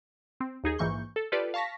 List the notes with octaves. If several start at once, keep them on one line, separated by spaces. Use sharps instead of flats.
C4
D#2 D#4 G#4
A#1 G#2 E3 A#3 C#6 G6
A4
F4 G4 A4 B4 D5
F5 A5 C#6 A#6 B6